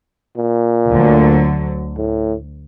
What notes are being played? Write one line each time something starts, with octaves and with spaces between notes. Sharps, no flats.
A#2
D2 D3 F#3
A2